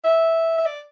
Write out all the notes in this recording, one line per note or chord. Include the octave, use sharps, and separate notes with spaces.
E5
E5
D5